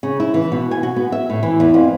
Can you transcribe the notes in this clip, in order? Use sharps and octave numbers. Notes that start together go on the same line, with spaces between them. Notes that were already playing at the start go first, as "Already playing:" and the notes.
C#3
E4
E3
B2
G#5
F#4
B3
E5
A2
E3
E2
F2